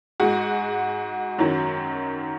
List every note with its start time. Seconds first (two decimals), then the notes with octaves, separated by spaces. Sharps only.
0.20 G#2 G#3 F#4
1.38 F#2 D#3 F#3